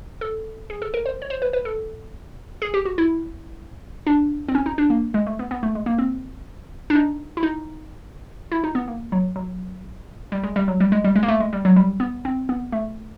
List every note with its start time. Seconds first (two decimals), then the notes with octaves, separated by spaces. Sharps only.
0.21 A4
0.70 G#4
0.82 A4
0.94 A#4
1.06 C5
1.22 C#5
1.30 C5
1.42 B4
1.53 B4
1.65 A4
2.62 G#4
2.74 G4
2.85 F#4
2.98 E4
4.07 D4
4.48 C4
4.55 C#4
4.66 D#4
4.78 D4
4.90 A#3
5.14 G#3
5.27 A3
5.39 B3
5.51 B3
5.63 A3
5.75 G#3
5.86 A#3
5.98 C4
6.90 D4
6.95 D#4
7.37 E4
7.43 D#4
8.52 E4
8.64 D#4
8.75 B3
8.88 A#3
9.12 F#3
9.36 F#3
10.32 G3
10.43 G#3
10.56 G3
10.68 F#3
10.80 G3
10.92 G#3
11.04 G3
11.16 G#3
11.23 A#3
11.28 A3
11.40 G#3
11.53 G3
11.65 F#3
11.76 G3
12.00 B3
12.25 C4
12.49 B3
12.72 A3